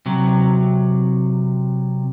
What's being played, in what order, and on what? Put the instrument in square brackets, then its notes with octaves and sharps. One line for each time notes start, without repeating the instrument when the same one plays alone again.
[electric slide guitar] C3 F#3